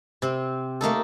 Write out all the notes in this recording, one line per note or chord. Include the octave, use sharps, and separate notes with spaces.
C3 C4
A3 A#3 D#4 A4